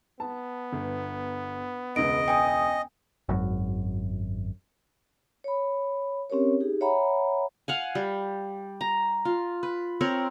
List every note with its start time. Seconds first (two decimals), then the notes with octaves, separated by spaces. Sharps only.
0.20 B3 A5
0.73 G1
1.96 E1 C#2 D#5 D7
2.28 G5 G#5 D#6
3.29 G#1 F#2
5.44 C#5 B5
6.30 C4 C#4 G4 A#4 C#5
6.61 D#4 G4 G#4
6.81 C#5 E5 F#5 G#5 A#5 B5
7.68 F5 F#5 G#5
7.95 G3
8.81 A#5
9.25 F4
9.63 B4
10.01 C4 A#4 C#5